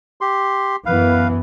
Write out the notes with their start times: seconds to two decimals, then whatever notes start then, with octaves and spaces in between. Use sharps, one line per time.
0.21 G4 C6
0.86 F#2 E3 B3 B4 F5